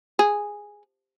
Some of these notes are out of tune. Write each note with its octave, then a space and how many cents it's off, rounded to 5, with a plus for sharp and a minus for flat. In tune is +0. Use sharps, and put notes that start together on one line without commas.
G#4 -5